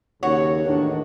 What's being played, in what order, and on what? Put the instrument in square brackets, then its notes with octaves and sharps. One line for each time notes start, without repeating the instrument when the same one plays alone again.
[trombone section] D#2 C#3 [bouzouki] F#4 C#5
[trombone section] E2 A2 D#3 [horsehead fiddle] D4